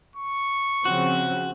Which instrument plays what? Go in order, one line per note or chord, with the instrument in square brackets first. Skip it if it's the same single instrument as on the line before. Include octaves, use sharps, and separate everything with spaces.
[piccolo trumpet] C#6
[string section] C#3 F3 C4 [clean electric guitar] F#4